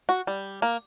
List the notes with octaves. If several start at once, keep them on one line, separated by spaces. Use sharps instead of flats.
F#4
G3
A#3